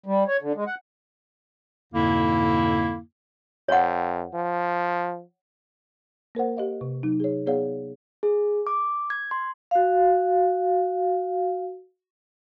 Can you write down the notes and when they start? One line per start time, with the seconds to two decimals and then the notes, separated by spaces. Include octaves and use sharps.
0.06 G3
0.28 C#5
0.42 D3
0.56 G#3
0.67 F#5
1.93 F2 G#2 B2 D3 A#3 E4
3.68 F2 C#5 F#5
4.34 F3
6.35 A#3 A#4 C5 F#5
6.57 G4 D#5 F5
6.81 C3
7.03 F#3 D#4
7.20 G#4 C#5
7.46 B3 G#4 C#5 D5 F5 F#5
8.23 G#4
8.67 D6
9.10 G#6
9.31 C6
9.71 F#4 F5